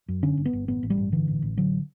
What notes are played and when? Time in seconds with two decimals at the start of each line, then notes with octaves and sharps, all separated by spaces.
0.08 F#2
0.23 D3 C#4
0.37 G1
0.45 B3
0.53 G1
0.68 A1 B3
0.83 A1
0.90 G3
0.98 G2
1.12 D3 E3
1.28 A1
1.42 A1
1.57 D3 F#3